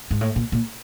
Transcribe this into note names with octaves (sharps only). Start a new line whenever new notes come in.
G#2
A2
A#2
A#2